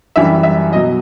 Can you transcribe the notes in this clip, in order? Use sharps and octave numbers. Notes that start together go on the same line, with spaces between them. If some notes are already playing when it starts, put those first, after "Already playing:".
F#2 E3 G3 E5
E5
B2 F#3 D#5